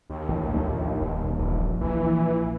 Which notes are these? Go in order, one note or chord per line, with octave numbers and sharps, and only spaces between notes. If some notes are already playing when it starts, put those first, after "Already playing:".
D#2
A1 E2
A#1 A2
D#1 B2
D#1 A#1 E2 G2
A#1 E3